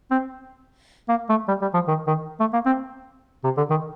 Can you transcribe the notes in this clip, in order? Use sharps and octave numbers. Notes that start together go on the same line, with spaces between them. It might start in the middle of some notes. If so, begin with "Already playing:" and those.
C4
A#3
A3
G3
G3
F3
D#3
D#3
A3
A#3
C4
C3
D3
D#3